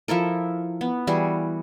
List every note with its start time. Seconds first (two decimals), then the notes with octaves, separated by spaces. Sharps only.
0.08 F3 E4 A4 A#4
0.81 B3
1.07 E3 G3 F#4 G#4